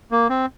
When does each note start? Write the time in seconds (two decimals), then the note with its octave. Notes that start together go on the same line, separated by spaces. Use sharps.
0.11 A#3
0.30 C4